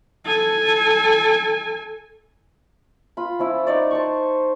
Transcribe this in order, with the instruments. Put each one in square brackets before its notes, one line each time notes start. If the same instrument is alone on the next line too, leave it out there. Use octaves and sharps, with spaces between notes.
[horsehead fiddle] A4 G#5
[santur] F4 B5
F3 C#4 E4
D#4 C#5 D5
C5 A5 C#6